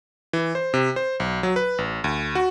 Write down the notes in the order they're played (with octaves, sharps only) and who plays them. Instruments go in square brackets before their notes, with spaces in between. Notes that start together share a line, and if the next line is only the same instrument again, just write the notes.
[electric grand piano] E3
C5
C3
C5
B1
F#3
B4
A1
D2
F#4